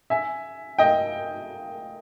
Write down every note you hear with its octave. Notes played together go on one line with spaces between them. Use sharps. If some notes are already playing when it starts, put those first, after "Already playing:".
E5 G#5
D#5 G5